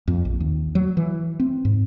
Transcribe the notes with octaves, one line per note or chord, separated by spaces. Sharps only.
F2
A#1
D#2
F#3
E3
C4
G#2